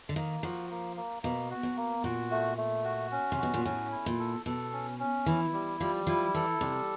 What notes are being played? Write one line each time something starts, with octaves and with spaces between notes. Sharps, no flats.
D3
D#3 A#3
F3 F#4
A#3
A#3
B2 A#3
F#4
B2
A#3
A#2 F#4
A3
A3
F#4
C#4
C3
B2 F#4
A#2
A2 C#4
E4
A#2
A4
B2 A4
C#4
C#4
E3 E4
G3
F3 G3
F3 E4
E3 A4
C3 G3